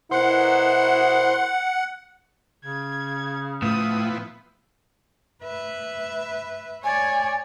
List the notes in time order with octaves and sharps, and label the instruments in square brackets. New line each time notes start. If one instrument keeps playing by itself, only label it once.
[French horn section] B2 E4 A#4 [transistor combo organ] C5 [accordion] F#5
[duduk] C#3 [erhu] G#6
[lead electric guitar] A2 [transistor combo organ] F3 B3 E4 [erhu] D#6
[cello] B4 E5
[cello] C#5 D5 [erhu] G#5